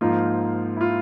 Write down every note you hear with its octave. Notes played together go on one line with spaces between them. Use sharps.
G#2 F3 A#3 D#4 F4
E4
F4